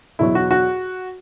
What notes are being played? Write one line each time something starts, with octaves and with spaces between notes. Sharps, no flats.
E2 B2 F#3 E4
F#4
F#4